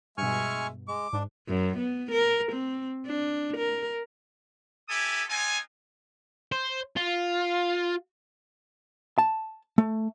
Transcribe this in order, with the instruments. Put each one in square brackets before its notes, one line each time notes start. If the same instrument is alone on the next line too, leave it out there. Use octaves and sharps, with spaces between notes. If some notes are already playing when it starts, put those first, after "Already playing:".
[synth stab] G2 B2 [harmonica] G#3 E5 [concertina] G#5 C#6 F6
[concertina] G#3 [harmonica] D6
[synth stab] G#2 [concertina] D4
[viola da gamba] F#2
B3
A#4
C4
D4
A#4
[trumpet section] E4 G4 A4 G#5 D#6
C4 D#4 F4 G#5
[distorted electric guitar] C5
F4
[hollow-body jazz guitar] A5
A3